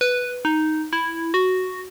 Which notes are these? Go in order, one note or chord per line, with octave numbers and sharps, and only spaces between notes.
B4
D#4
E4
F#4